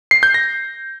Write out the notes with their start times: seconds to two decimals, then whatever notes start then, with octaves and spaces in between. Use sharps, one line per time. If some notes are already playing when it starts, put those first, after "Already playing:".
0.11 C7
0.23 G6
0.34 A#6